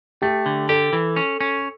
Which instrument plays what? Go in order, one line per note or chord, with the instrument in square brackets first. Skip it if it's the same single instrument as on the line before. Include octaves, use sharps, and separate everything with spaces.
[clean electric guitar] A3 [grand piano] G4
[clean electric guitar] D3
[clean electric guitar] G4 [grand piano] A4
[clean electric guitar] E3
C#4
C#4